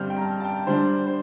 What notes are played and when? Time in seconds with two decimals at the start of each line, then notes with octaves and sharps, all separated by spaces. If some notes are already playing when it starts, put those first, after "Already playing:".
Already playing: G2 D3 G3 C4 F6 G6
0.10 G5
0.17 A#5
0.22 A5
0.40 A5
0.45 G5
0.67 D3 G3 D4 C5
1.07 C5